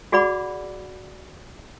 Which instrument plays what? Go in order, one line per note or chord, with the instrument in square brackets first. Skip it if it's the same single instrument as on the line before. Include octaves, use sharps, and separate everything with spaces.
[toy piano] F#4 G#4 D5 F#5 B5 D6